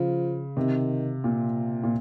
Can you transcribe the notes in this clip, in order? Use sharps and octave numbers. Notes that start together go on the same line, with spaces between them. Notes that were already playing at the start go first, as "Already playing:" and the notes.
Already playing: C#3 F3
C3 D#3
A#2
A#2